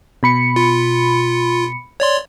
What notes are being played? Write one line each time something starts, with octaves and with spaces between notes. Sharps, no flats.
B2 B5 C#7
F4
C#5 D5 C6